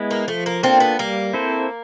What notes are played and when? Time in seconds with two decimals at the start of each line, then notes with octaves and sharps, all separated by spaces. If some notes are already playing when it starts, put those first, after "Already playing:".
Already playing: G#3 B3 E4
0.11 A#3
0.27 F3 A3
0.46 A#3
0.63 A#3 C4 D4 F4 A4
0.80 B3
0.99 G3 A#3
1.33 C4 E4 A4 C5